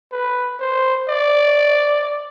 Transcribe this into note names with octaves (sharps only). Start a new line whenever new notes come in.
B4
C5
D5